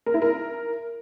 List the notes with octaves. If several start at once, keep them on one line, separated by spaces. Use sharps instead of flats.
A#4
E4
A#4